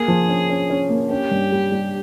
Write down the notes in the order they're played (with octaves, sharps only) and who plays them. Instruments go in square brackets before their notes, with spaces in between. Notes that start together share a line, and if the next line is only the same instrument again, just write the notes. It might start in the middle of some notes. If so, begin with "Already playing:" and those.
Already playing: [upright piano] A#3 [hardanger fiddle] G#4
[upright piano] F3
C#4
C#4
C#4
A#3
[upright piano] C#4 [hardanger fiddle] G4
[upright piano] G2
G3
G3